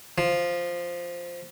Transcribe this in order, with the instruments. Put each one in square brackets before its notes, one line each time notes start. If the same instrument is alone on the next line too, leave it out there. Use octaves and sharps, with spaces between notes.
[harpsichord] F3